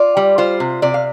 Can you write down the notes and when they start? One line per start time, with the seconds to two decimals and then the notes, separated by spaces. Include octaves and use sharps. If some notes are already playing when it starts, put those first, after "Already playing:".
Already playing: F4 D5
0.17 G3
0.38 F4 C5
0.60 C3
0.82 C3 D5
0.94 F5